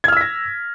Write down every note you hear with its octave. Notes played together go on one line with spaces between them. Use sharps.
E6 F6 G#6 A#6 B6